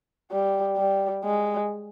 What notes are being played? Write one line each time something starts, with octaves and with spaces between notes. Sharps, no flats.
G3
G3
G#3